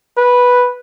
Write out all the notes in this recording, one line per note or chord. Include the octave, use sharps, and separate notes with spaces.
B4